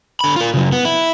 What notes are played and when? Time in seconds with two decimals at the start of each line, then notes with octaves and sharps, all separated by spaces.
0.21 D3 B5
0.36 F4 A#4
0.54 C#3 F#3
0.72 B3
0.85 E4